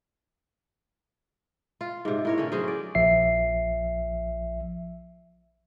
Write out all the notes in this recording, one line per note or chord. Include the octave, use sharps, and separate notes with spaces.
F4
G#2 C3
A2 A#4 C#5
D3 C#4
F#3 C#4 G#4 C5
D5
A#1 F3 E5 C7